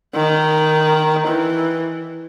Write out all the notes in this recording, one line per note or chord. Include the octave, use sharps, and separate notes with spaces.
D#3
E3